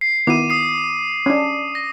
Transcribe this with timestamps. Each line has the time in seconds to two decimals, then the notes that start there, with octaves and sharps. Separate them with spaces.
0.01 C7
0.27 D#3 B3 E4 D6 D#7
0.50 D#6 C7
1.26 C#4 D4
1.75 A#6